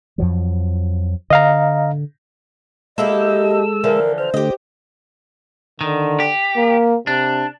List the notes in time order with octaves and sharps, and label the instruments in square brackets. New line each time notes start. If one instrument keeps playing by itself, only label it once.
[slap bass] F2 F3 F#3
[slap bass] D3 [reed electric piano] D#5 F5 A#5
[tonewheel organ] G#3 A4 E6 [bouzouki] A#3 E4 G4 [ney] D#5
[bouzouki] D3 E3 F3 [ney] A#4
[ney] C5 [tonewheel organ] F6
[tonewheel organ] D3 A3 [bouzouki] G4 D#5
[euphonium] D3 [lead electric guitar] D#3
[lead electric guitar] G4
[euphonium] A#3
[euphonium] C3 [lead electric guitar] D4